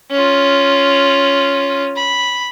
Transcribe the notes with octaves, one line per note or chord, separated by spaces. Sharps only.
C#4 F4
B5